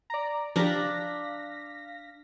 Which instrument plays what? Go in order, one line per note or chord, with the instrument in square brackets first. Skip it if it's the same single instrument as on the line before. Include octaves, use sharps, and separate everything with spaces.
[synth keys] D5 A#5
[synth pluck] F3 G4 [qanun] D4 A#5 [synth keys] F5 A#6 B6